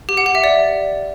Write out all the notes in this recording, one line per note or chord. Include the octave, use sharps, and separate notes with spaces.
G4
F#5
G4
E5
D5